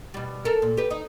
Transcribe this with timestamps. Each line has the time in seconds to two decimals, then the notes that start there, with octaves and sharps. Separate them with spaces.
0.14 B2 G3
0.45 A4 A#4
0.62 A#2
0.77 G4 B4
0.91 D#4